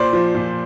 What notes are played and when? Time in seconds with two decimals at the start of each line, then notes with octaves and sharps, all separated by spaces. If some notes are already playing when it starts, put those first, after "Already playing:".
Already playing: A#2 C5 D5
0.13 F3
0.35 A#2